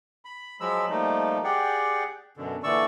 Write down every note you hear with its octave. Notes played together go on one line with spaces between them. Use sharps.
B5
F3 F#3 G#3 B5 E6
F3 G3 A3 A#3 D#4
G4 G#4 D5 F#5 G5
F#2 B2 D3
A#2 D3 E3 D5 C#6 E6